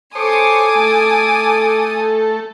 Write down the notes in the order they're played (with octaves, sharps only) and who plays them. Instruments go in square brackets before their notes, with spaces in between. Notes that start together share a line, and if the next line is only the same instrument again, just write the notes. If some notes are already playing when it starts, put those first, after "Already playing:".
[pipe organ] A4 [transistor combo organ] C5 C#5 [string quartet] G#5 D#6 [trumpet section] D6
[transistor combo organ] A3